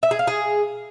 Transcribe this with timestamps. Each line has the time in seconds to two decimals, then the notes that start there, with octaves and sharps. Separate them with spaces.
0.03 E5
0.11 G#4
0.19 F5
0.27 G#4